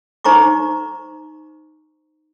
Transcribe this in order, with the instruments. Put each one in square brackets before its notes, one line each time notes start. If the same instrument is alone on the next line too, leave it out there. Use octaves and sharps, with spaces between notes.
[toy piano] D#4 C5 A#5 C#6 D6